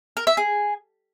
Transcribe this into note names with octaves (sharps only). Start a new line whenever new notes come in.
A#4
E5
G#4